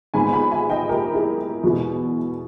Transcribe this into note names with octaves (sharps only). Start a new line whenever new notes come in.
G#2 D#3 G#3 B3 G#5 B5
G#5 B5
E5 G#5
D#5 G5
G4 A#4
E4 G#4
E2 B2 G#3 B3 E4